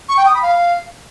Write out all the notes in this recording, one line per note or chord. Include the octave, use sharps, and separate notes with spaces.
C#6
G5
D#6
B5
F5